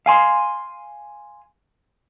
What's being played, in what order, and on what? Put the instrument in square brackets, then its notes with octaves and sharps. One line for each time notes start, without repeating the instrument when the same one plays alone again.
[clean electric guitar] F5 G#5 C6